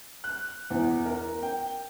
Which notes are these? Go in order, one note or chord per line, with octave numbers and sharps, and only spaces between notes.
F#6
E2
A#4
G5